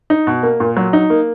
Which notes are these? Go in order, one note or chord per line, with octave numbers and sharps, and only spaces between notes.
D#4
B2
A#3
A#2
F#3
D#4
A#3